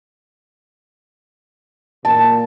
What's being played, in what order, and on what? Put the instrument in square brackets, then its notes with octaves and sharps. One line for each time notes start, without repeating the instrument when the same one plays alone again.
[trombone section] A#2 [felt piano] A5